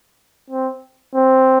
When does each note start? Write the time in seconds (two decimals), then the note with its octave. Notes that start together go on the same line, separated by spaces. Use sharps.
0.50 C4
1.15 C4